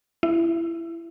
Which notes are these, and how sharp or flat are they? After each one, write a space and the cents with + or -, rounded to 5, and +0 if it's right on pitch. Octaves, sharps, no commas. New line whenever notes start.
E4 +20